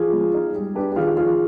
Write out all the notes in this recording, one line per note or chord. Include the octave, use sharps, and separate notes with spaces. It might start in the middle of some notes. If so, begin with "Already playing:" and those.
Already playing: F3 F4 G#4
G#3
D#4
G3
D4 G4 B4
G4
D#3 F4 G#4
F3 F4 G#4